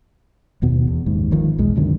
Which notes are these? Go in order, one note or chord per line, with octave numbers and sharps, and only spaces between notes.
F#1 D#2 B2 B3
E2
F#1 D#2 G#2
G1 D#3 F3
B1 E2 G#3
C2 F#2 D3 D#3